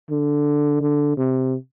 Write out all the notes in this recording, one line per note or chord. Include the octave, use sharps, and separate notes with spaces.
D3
D3
C3